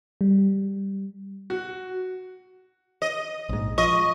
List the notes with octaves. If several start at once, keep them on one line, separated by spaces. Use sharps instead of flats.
G3
F#4
D#5
A#1 G#2
F3 D#5 C#6